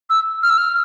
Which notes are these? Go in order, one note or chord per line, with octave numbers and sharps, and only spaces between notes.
E6
F6
E6
F6